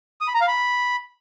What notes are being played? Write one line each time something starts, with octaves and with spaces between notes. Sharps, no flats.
D#6
B5
A#5
F5
B5